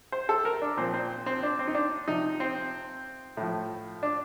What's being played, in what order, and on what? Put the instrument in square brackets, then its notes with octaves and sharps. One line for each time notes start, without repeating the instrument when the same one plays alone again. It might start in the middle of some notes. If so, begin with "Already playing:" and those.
[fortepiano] C5
A4
A#4
D4
A#2 F3 C4
C4
C4
D4
C4
D#4
D4
C3 F3 D#4
C4
A2 F3
D4